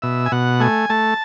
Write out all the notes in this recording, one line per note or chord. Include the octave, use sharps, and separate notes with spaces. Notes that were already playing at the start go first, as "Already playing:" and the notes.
B2 E5
G#5
B2 F#5
A3 G#5
A3 A5